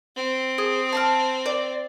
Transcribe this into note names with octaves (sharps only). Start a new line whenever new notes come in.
C4
G#4
A5 C6 F6
D5